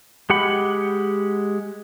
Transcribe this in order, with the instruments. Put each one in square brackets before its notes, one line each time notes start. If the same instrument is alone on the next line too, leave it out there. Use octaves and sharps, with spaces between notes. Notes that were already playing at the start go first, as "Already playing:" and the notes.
[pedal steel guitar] G#3 G4 F#5 B5